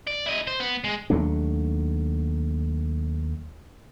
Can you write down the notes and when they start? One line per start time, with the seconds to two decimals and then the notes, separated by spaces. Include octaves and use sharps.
0.07 D5
0.26 E4 D#5
0.47 C5
0.60 B3
0.84 G#3
1.10 D#2 F#3 A3 D4